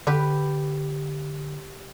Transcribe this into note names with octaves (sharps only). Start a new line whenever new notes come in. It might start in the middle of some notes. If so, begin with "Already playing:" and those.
D3 G4 B4